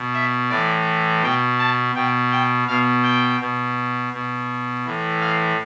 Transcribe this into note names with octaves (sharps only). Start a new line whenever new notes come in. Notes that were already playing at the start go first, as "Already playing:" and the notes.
Already playing: B2
E5
A2 E3 D5
B2 G5
A5
B2 G5
G5
B2 F5
G5
B2
B2
A2 E3
F5